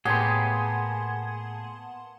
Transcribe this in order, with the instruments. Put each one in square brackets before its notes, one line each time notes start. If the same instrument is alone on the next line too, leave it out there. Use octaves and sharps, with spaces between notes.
[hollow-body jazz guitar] A2 [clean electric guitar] A#3 B3 G4 [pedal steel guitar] G#4 [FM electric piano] F#5 A5 C6